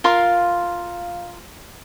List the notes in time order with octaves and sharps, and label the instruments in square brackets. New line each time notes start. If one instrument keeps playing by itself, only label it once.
[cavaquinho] F4 A#4 F5 C6